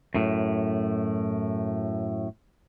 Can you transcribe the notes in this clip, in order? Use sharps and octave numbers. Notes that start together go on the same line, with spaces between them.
F#2 A2